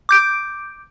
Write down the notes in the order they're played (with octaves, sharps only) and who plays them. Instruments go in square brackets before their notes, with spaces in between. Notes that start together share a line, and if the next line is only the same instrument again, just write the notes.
[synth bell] D6 G6 D7